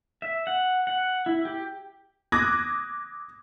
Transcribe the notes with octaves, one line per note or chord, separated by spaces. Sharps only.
E5
F#5
F#5
E4
G4
D6 D#6 F#6 G#6 A#6